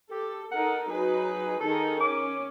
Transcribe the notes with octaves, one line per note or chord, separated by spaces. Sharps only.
G4 A4
D#4 A4 A#4 F#5
F#3 D#4 G#4 B4
D#3 D#4 G#4 A4
C#4 D6